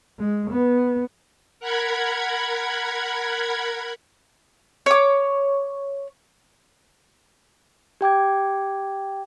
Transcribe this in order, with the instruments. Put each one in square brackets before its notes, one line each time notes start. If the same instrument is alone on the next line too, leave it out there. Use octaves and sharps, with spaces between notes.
[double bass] G#3
B3
[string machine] A#4 F#5 B5 G#6
[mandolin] C#5 D6
[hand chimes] G4 G5 D6 G#6